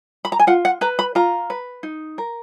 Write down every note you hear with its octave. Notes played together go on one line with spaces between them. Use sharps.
B5
A#5
G#5
F4 F#5
F#5
B4 A#5
B5
F4 A#5
B4
D#4
A#4